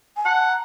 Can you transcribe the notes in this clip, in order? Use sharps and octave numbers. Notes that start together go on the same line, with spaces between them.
G#5
F#5 A5
A#5